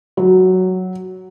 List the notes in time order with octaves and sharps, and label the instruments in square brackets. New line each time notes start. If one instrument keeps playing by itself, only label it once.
[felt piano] F#3